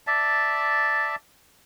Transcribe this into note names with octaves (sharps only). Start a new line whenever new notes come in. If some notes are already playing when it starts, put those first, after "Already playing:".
D5 E5 A5